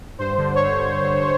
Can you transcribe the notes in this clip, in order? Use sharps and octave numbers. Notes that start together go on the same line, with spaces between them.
G2 C5
D3
C#5